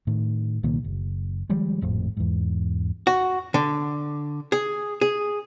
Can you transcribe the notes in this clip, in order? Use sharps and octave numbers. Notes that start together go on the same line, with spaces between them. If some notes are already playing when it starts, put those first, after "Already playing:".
A2 D#3
C2 A#2 D#3 A#3
F#1
D#3 F3 G3 G#3
G#1 F2 A2
E2 G#2
F#4
D3
G#4
G#4